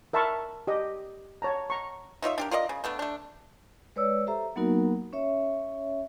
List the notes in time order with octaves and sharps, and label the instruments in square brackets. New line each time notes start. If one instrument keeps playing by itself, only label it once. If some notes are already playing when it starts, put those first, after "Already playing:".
[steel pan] A#4 E5 A5 B5 C#6
G4 D#5
C#5 A5 A#5
A#5 C#6
[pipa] D#4 F4 C#5 E5
D4 G4 A#4
F4 A#4 D5 D#5
C#3
A3 B3 D4
A3 D4
[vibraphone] G#3 B4 C#5 D5 E6
G4 A4 C5 E5 A#5
F#3 A#3 B3 D#4 F#4 A#4
C#4 C#5 E5